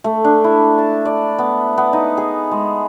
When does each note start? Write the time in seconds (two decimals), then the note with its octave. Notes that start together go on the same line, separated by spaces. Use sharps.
0.04 A3
0.25 D4
0.44 E4
0.78 A5
1.05 D5
1.39 B3
1.78 B3
1.93 D#4
2.17 G#4
2.51 G#3